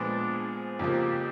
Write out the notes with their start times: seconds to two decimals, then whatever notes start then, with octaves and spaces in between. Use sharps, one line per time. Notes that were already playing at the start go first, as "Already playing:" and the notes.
Already playing: A#2 F3 G#3 B3 D4
0.33 G#4
0.79 F2 C#3 F3 A#3 G4